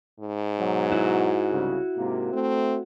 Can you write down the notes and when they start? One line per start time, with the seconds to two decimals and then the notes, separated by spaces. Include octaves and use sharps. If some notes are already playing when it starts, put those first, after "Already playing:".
0.20 G#2
0.58 B2 F#3
0.92 E4 F#4
1.51 C2 C#3
1.96 G#2 C3 A#3
2.33 A3 C4